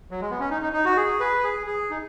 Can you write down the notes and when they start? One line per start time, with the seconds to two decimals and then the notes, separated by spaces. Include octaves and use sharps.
0.11 F#3
0.21 G#3
0.31 B3
0.40 C#4
0.51 D#4
0.62 D#4
0.73 D#4
0.85 F#4
0.97 G#4
1.20 B4
1.43 G#4
1.67 G#4
1.90 D#4